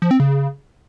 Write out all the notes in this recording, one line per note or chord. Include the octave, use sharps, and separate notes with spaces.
F3
C4
C#3